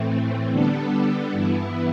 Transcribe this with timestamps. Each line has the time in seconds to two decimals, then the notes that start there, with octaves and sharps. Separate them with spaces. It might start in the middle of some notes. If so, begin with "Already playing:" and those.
Already playing: A2 E3 A3 C4
0.50 D3 G3 B3 D4 A4
1.31 G2 E3 B3 E4